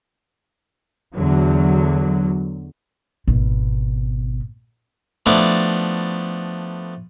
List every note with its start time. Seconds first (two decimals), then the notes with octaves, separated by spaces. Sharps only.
1.15 E2 D3 F#3
3.27 G#1 B2
5.26 F3 A3 B3 D4 E4